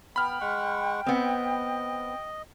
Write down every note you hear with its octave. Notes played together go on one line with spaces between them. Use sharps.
B3 G5 B5 F6
G#3 F#5 C#6
B3 C4 D#5